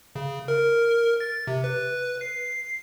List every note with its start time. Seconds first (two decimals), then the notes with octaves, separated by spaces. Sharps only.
0.16 C#3
0.48 A#4
1.20 A6
1.47 C3
1.64 B4
2.21 C7